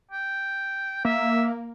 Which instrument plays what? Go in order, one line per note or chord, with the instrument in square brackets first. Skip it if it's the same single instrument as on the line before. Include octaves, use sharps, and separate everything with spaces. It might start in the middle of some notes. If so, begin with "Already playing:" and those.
[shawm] G5
[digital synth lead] A#3 [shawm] E5